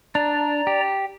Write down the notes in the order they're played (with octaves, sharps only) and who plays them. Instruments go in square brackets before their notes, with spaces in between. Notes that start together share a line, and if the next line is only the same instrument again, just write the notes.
[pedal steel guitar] D4 [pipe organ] D5 A#5
[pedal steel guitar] G4